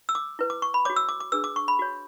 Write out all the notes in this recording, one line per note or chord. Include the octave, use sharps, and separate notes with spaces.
E6
D6
E4 B4
D6
C#6
B5
F#4 C#5 D6
E6
D6
D6
D4 G#4 B4 E6
D6
C#6
B5
F#4 C#5